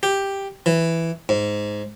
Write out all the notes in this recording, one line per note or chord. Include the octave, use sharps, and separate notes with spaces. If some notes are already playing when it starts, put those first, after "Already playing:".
G4
E3
G#2